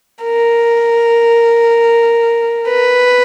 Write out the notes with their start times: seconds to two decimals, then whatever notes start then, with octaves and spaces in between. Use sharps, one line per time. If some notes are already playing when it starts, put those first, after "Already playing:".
0.24 A#4
2.68 B4